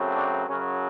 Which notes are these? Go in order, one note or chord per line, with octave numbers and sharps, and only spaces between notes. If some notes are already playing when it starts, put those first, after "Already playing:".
Already playing: F#2 C#3 F#3 A3 C4
D4
F#2 C#3 F#3 C#4